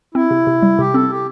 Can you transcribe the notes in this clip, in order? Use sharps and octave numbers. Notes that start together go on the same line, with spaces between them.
C4 E4
C3
C3
G3
C3 G4
C4 A4
G4